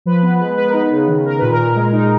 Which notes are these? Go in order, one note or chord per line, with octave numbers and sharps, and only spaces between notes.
F3 B4
B3 B4
G#3 B4
B3 B4
A#4
D#4 B4
C#3
D#3
D#3 A#4
A#2 B4
A#4
A#2
G#3
D#4